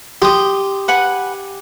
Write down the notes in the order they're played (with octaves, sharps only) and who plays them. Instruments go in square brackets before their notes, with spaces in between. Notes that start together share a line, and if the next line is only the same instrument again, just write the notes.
[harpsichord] G4 [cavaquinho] C6 D#6
[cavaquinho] B4 F#5 G#5